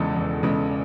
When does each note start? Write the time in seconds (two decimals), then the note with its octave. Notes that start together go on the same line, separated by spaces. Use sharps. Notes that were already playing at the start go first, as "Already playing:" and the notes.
Already playing: E1 E2 C#3 G#3 A4
0.15 E1
0.43 E2 C#3 G#3